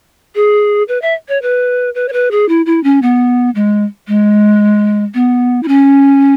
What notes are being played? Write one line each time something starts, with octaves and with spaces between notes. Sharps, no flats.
G#4
B4
E5
C#5
B4
B4
C#5
B4
G#4
E4
E4
C#4
B3
G#3
G#3
B3
E4
C#4